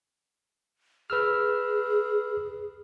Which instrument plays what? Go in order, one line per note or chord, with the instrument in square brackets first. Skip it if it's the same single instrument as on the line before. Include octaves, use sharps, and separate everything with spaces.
[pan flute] G#4 [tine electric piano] B4 E6 F6